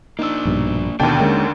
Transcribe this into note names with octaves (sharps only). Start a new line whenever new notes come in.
A#3 D4 D#4 E6
A#1 G2 B2
D#2 B2 D3 A3 D4 F#5 G5 A5
D3 G#3 A#3 C#4